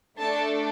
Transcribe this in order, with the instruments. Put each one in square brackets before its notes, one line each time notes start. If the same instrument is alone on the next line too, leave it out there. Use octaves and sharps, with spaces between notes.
[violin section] A3 D4 A4 A5